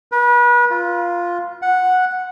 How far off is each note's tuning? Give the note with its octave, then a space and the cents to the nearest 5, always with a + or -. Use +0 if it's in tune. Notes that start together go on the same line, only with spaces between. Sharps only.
B4 -35
F4 +0
F#5 -5